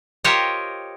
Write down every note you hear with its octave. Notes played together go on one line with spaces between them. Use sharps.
F4 G4 A#4 C5 C#5 D#5